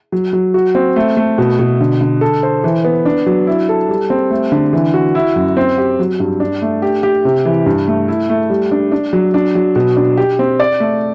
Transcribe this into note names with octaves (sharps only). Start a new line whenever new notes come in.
F#3
F#3
F#4
C4
A3
A3
B2
B2
D3
D3
A4
C5
E3
B3
D4
F#3
E4
A4
G3
C4
A3
D3
E3
F#4
E4
F#2
C4
G4
F#3
G2
D4
A3
G4
G4
C3
E3
G2
A3
E4
A3
G3
D4
D4
F#3
D4
F#3
B2
D4
G4
C4
D5
A3